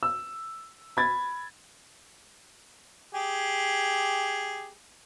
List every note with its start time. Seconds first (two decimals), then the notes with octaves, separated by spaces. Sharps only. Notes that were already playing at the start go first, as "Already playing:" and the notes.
0.03 E6
0.97 B5 G#6 A6
3.14 G4 G#4